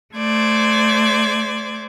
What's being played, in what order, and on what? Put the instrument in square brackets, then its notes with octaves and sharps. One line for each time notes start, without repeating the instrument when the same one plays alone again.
[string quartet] A3 C5 D5 G#6